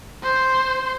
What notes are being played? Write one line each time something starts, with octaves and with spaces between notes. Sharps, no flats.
C5